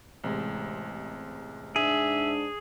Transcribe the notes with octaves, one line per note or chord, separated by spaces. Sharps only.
A1 C3 G#3
G#2 D4 G#4 E5